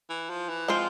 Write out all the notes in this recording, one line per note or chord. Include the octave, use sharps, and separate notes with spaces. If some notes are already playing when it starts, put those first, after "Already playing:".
E3
F3
E3
F3 G#3 C4 F4 C5